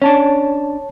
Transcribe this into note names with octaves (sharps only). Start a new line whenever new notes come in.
C#4 D4 C#5 A5